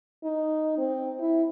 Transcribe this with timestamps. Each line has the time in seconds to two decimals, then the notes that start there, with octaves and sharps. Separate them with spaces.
0.23 D#4
0.78 C4
1.20 E4